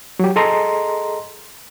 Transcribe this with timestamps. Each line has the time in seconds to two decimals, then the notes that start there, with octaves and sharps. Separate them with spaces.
0.19 F#3 G4
0.36 G#4 A4 D#5 A#5 C6